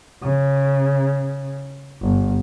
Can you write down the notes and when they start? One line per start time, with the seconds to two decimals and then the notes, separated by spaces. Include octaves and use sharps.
0.23 C#3
2.01 G1